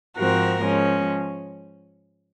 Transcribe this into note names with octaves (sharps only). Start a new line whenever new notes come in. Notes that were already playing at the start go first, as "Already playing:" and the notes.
G#2 F3 C4 F#4 A#4
F3 G#3 C#4